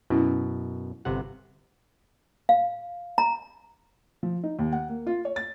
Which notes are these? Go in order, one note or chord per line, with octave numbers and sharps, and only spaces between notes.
F#2 B2 C#4 E4
G1 C3 G4 F#5
F5
A#5
F3
D#4
D#2
F#5
A#3
F4
C#5
A6